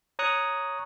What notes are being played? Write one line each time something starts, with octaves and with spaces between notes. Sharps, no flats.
C#5 A#5 C#6 D#6 F#6